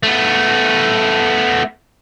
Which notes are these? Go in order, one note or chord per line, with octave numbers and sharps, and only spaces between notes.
A3 B3